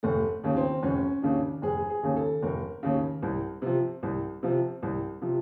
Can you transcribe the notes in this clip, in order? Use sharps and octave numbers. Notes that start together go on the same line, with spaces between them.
F1 A3
D#2 C#3
C4
F1 C#4
D#2 C#3 D4
F1 G#4
G#4
D#2 C#3
A4
F1 A#4
D#2 C#3
C2
C3 F3
C2
C3 F3
C2
C3 F3